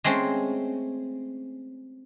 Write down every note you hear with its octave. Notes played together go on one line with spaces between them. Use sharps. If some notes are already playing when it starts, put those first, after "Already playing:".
G#3 A3 C4 C#4